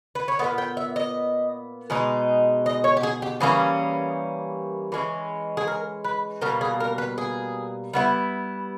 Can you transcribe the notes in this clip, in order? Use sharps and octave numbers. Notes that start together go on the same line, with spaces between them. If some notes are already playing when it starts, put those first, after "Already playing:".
B4
C#5
A#2 G#3 B3 D#5
G5
E5
D#5
B2 G#3 D#4
D#5
C#5
G4
G#4
G4
E3 G3 A#3 C#4 G#4
E3 G#3 C#4
G#4
A#4
B4
B2 G3 A#3 A#4
G#4
A#4
B4
G#4
G3 B3 E4